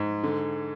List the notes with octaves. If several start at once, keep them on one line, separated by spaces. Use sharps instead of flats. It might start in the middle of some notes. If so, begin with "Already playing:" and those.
Already playing: G#2 G#3
D3